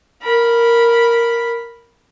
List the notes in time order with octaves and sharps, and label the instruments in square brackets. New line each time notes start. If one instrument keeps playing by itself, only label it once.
[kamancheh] A#4 B5